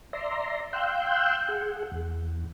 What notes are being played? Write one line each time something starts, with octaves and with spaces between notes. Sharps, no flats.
D5 E5 A#5 C6
F5 G5 C6 E6 F#6 G6
G#4 F#5
E2